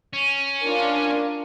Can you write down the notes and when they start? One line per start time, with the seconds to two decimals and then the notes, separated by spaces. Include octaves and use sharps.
0.13 C#4
0.63 D4 F4 A#4